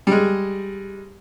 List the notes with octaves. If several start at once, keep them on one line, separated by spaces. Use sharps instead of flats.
G3 G#3